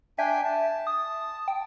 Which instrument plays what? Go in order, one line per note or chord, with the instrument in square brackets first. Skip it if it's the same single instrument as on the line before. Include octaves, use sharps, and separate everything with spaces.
[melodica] D4 G5 G#5 [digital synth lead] E5
[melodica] A5
[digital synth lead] D#6
G5